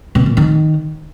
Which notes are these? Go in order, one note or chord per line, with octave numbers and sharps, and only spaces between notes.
B2
A#2
D#3